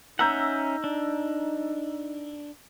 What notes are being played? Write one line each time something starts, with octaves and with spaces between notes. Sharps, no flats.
C#4 D#4 E5 F#5 A#5 E6 G6
D4